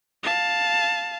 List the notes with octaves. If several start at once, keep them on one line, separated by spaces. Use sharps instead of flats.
F5 A5